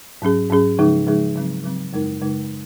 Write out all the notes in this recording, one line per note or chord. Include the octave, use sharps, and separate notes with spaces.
G#2 F#3 C#4 G#4
G#2 F#3 C#4 G#4
C#3 F3 G#3 D#4 G#4
C#3 F3 G#3 D#4 G#4
C#3 F#3 C4
C#3 F#3 C4
F#2 C#3 G#3 D#4 A#4
F#2 C#3 G#3 D#4 A#4